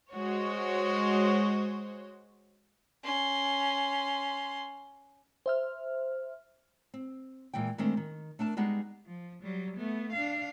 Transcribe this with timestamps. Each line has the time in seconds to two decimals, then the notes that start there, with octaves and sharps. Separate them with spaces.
0.12 G#3 F#4 C5 C#5
3.04 C#4 C6
5.46 C5 E5 F6
6.94 C4
7.53 A#2 E3 G#3 G5
7.78 D#3 G#3 A3 C4 D4
7.97 D#3
8.39 A3 D4 A#4 A5
8.57 G3 G#3 B3 D#4 G#4
9.06 F3
9.42 F#3 G3
9.77 A3 B3
10.12 D4 F5